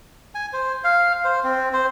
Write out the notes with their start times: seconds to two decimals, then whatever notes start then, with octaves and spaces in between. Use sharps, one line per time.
0.35 G#5
0.53 C5
0.84 F5
1.24 C5
1.44 C4
1.73 C5